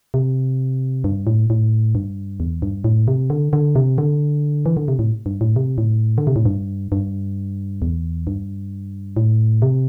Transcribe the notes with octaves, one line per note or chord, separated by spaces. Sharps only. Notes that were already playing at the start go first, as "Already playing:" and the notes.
C3
G2
A2
A2
G2
E2
G2
A2
C3
D3
D3
C3
D3
E3
D3
C3
A2
G2
A2
C3
A2
D3
C3
A2
G2
G2
E2
G2
A2
C3